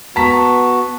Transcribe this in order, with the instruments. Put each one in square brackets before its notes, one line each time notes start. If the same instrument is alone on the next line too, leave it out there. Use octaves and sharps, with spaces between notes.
[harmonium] B3 F#4 [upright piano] A5 A#5 B6